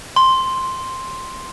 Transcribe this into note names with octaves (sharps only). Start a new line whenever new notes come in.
C6